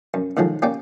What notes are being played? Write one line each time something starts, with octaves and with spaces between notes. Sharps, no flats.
F#2
A2 D#3 F3 F#3 G#3
A#3 C#4 G4 D5 G5